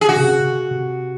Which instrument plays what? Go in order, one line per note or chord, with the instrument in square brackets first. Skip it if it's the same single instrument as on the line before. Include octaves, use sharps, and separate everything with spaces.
[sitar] G#4
[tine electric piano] C#3 [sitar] F#4
[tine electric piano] C3
C#3
C3
C3